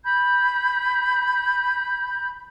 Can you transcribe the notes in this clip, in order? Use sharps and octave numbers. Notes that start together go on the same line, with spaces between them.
B5 G6